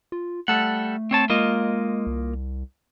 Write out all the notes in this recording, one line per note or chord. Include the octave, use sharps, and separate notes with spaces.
F4
G3 A3 A4 F#5
C4 C#5 A5
G#3 A#3 F4 D#5
C2